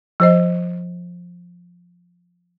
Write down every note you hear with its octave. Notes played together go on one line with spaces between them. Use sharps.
F3 C5 D#5